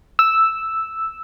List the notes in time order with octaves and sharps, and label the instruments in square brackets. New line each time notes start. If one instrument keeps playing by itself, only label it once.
[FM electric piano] E6